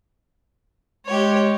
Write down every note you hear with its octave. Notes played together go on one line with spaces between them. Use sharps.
G#3 G4 C#5